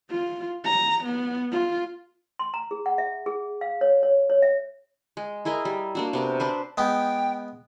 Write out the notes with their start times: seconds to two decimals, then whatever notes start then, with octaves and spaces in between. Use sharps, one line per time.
0.11 F4
0.65 A#5
1.05 B3
1.52 F4
2.39 C6
2.54 A#5
2.71 G#4
2.86 F#5
2.98 E5
3.26 G#4
3.61 F5
3.81 C#5
4.03 C#5
4.30 C#5
4.42 E5
5.17 G#3
5.45 E4 G#4 A#4 D#5
5.65 G3
5.95 A#3 D4 F#4
6.13 C3 B3 A#4
6.40 D4 B4 C5
6.77 G#3 B3 G5